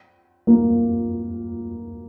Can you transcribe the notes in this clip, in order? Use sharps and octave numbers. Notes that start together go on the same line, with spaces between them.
A#3